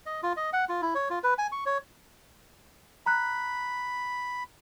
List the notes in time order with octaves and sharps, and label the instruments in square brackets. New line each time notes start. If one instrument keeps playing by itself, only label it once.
[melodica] D#5
F4
D#5
F#5
F4
E4
C#5
F4
B4
G#5
C#6
C#5
[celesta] A#5 F#6 [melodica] B5